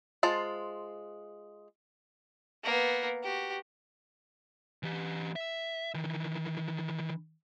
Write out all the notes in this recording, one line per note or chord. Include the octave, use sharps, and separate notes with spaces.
G#3 F4 C5 A5
A#3 B3
F#4 G4
E3 G4
E5
D#3 E3